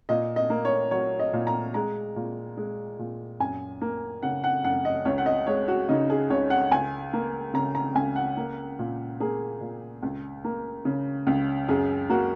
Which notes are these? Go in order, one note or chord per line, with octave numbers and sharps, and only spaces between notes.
A#2 D#5
D#5
A#3
C#5
F#3 C#5
D#5
A#2
A#5
G#3 A#5
A#2
G#3
A#2
F#2 G#5
A#3
C#3 F#5
F#5
F#2 F#5
D#5
C#2 C#5
F#5
D#5
G#3 C#5
F#4
C#3 D#4
G#4
C#2 C#5
F#5
C#2 G#5
A#3
C#3 A#5
A#5
C#2 G#5
F#5
A#3
A#2
A#3 G#4
A#2
C#2
A#3
C#3
C#2
F#2 G#4
A#3 F#4